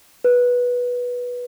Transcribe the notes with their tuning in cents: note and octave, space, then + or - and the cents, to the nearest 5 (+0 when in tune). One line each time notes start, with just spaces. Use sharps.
B4 -10